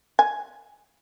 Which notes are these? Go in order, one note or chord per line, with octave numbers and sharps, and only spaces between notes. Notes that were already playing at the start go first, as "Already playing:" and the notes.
G#5